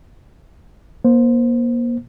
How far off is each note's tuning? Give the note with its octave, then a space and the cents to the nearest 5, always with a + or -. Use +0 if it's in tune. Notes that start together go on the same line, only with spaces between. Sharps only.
A#3 +35 C5 +0